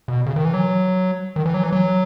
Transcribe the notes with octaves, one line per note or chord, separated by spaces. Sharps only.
B2
C#3
D#3
E3
F#3
D#3
E3
F#3
E3
F#3